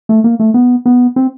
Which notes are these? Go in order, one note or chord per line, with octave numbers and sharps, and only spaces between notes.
A3
A#3
A3
B3
B3
C4